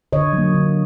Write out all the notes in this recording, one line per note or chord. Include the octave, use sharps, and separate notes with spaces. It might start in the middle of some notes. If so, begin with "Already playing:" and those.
D3 C#5 D#5
F#3 A#3
D3